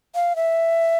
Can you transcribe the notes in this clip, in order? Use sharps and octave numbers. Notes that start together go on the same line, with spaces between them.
F5
E5